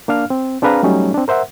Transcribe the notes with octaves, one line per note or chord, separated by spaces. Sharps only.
A#3 D4 F5 F6
C4
C4 D4 G#4 B4 F5 A#5
F#3 G3 A3 C#4 D#4
C4 D4
A#4 C5 E5 F#5